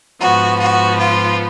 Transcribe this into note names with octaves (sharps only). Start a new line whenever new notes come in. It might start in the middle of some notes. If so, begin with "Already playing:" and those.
G#2 F3 B3 F#4
F#4
F4